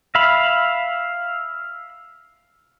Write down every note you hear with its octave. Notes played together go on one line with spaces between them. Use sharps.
E5 F5 B5